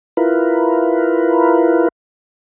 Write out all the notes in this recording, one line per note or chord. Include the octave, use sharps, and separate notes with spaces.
E4 F4 A#4 B4